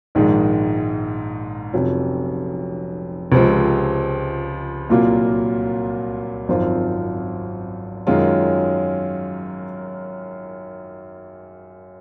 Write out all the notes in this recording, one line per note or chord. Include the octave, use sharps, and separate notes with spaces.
A#1 G#2 D#3 G#3
F1 F2 C3 F#3 C#4
C#2 C3 F3 G#3 C4
C2 A#2 F#3 A#3 F4
G#1 F#2 F3 C4 F4
F#2 D#3 G#3 C#4 F4